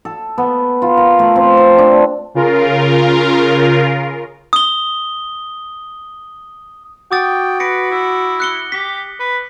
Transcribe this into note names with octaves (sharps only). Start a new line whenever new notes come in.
A4
B3
F4
A#4
A3
C4
A4
D4
C#3 F4 A#4
D#6 G7
F#4 G5 D6 D#6 A6
B4 A#6 C#7 D7
E4
F#6 C#7 G7
G4 B6
B4